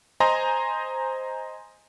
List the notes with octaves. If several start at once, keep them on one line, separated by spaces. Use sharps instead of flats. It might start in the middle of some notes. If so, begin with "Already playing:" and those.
C5 D#5 G#5 A#5 C6